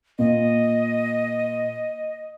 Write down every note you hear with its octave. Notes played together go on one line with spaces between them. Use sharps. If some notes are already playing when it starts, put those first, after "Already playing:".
A#2 D#5